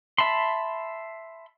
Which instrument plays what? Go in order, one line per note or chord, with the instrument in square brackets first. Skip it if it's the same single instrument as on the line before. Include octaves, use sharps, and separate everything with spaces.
[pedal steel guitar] E5 A5 B5 C6